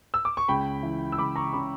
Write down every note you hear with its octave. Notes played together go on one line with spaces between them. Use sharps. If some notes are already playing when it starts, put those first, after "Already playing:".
E6
D6
C#6
C#2 G5 B5
E3
E6
C#2 B5 D6
A#5 C#6
C#3 B5 D6